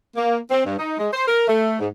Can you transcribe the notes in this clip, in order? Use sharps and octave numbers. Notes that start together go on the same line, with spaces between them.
A#3
C4
G2
D#4
G#3
C5
A#4
A3
G#2